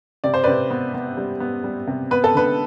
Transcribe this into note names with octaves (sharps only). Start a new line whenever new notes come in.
C3 D5
C5
C3 B4 D5
B3
B3
G3
B3
G3
C3
B3 B4
A4
D3 B4